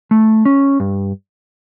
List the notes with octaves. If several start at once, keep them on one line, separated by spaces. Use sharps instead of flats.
A3
C#4
G2